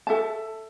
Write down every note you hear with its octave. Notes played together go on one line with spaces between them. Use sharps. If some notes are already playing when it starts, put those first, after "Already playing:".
A4 E5 A5